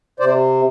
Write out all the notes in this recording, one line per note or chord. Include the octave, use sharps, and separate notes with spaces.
C3 C5 D5